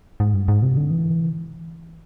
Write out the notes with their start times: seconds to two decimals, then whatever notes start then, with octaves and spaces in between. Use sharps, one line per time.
0.20 G#2
0.34 G2
0.48 G#2
0.62 C3
0.77 D3
0.90 E3